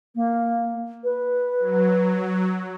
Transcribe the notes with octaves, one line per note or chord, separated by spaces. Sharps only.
A#3
B4
F#3